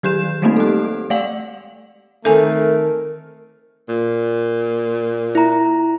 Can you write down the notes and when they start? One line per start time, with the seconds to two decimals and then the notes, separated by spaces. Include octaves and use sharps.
0.03 D#3 F#3 G4 G6 E7
0.42 F#3 G3 A3 A#3 C4 D#4
0.56 G4 A4
1.10 G#3 A3 D5 F5 F#5 F#7
2.25 D#3 A3 C4 D#4 A4 A#4 G#5
3.89 A#2
5.35 E4 A#5